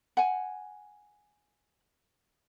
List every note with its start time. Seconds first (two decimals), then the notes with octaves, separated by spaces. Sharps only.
0.17 F#5 G#5